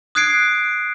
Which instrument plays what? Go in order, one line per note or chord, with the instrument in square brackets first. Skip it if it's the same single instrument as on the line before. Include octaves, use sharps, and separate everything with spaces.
[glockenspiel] D#6 F#6 G#6 C7 D7